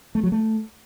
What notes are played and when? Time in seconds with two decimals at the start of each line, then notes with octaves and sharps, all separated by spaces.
0.15 A3
0.23 F#3
0.32 A3